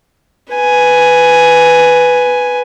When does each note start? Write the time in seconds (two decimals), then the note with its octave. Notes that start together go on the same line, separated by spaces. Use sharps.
0.54 B4 G#5